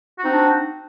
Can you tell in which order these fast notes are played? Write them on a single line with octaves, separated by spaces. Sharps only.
F#4 C4 D#4 D4